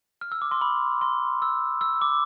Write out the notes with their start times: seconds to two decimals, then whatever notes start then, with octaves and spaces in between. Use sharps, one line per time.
0.21 F6
0.32 E6
0.42 D6
0.51 C6
0.61 B5
1.01 C6
1.42 E6
1.81 E6
2.02 D6